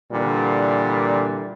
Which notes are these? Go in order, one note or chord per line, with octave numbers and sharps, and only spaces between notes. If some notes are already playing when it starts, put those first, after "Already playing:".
A#2 D3 E3 G3